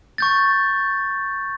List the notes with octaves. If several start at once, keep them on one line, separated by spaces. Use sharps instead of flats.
C#6 G6 A6